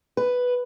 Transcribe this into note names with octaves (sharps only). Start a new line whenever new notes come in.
B4